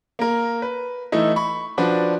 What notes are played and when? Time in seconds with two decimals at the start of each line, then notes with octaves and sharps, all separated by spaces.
0.19 A#3 A#4
0.62 B4
1.12 E3 A3 D#4 E4
1.36 B5 C#6
1.78 F3 D4 F#4 B4 D5